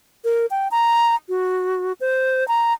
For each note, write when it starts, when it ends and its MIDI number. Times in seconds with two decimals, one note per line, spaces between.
0.24 0.46 70
0.51 0.68 79
0.71 1.15 82
1.29 1.92 66
2.00 2.46 72
2.48 2.73 82